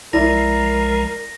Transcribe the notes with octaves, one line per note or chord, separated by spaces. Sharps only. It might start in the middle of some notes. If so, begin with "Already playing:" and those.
B1 F3 G#3 E4 A#4 D5 A#6